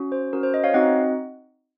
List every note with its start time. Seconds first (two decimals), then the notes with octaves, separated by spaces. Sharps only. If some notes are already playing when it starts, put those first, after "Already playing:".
Already playing: C#4 F#4
0.12 C5
0.33 C#4 F#4 A#4
0.43 C5
0.54 C5 D#5
0.64 C#5 F5
0.74 C4 D#4 F#4 D#5 F#5